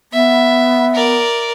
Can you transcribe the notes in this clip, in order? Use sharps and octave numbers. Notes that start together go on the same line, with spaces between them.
B3 E5
A#4 D5